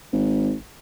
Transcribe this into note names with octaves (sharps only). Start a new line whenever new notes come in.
G#1